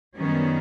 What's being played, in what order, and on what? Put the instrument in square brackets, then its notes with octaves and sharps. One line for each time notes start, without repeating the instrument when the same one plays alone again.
[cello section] F#2 D#3 G3 B3 C#4